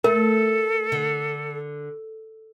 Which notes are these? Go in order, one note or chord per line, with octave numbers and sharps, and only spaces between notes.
A3 A4 A#4
D3